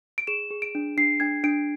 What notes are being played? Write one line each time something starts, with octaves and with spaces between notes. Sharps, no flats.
D7
G#4 E7
G#4
D7
D4
D4 C7
D4 G#6
D4 D7